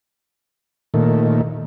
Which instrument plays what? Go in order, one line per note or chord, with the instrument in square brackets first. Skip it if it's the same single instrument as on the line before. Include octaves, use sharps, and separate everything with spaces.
[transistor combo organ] A#2 D#3 A3